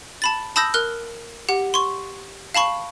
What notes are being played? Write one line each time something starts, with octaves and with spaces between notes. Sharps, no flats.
A5 B5 A6
A5 B5 D#6 E6 G6 A#6
A#4 F6 F#6
G4 F#5
C6 C#6
F5 A5 B5 C#6